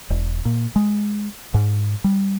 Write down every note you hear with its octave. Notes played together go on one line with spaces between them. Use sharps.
E1
A#2
G#3
G#2
G3